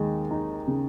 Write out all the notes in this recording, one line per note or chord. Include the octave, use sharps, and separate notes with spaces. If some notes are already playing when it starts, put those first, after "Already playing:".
Already playing: D#2 G#3
D#4
C#3